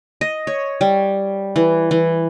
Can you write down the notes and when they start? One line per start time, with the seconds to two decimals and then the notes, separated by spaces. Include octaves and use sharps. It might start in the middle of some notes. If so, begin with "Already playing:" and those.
0.21 D#5
0.47 C#5
0.81 G3
1.56 E3
1.91 E3